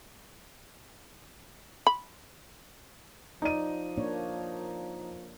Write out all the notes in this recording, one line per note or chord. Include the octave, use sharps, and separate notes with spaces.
B5
F3 D#4 D5 D#7
A#3 D4 C#5